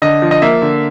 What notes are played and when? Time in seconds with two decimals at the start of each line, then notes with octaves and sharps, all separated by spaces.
0.02 D3 D#5
0.22 F3
0.31 D#5
0.42 A#3 E5
0.62 D3